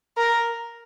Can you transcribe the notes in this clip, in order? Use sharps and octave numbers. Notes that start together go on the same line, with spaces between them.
A#4